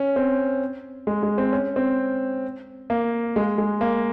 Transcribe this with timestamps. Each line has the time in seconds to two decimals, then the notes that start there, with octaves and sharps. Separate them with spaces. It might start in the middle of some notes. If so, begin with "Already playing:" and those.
Already playing: C#4
0.16 C4
1.07 G#3
1.23 G#3
1.38 C4
1.53 C#4
1.76 C4
2.90 A#3
3.36 G#3
3.58 G#3
3.81 A#3